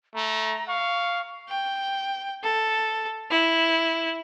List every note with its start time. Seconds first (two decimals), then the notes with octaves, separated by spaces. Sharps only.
0.15 A3 A#5
0.68 F5 C#6
1.49 G5
2.42 A4
3.30 E4